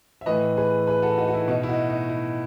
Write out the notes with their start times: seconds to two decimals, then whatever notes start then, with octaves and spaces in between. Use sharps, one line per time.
0.21 E5
0.26 A2 E3 B4 D#5
0.57 G#4 B4
0.87 G#4 B4
1.02 F#4 A4
1.17 D#4 F#4
1.28 F#4
1.33 E4
1.48 B2 D#4
1.63 E4
1.69 D#4 F#4
1.90 D#4
2.09 E4